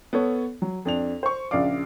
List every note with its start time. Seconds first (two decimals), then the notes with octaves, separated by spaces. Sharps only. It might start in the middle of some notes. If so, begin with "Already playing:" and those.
0.13 B3 A4 C#5
0.62 F#3
0.85 F2 D4 F7
1.23 C5 C#6
1.51 A#1 C#3 D5 F5 D6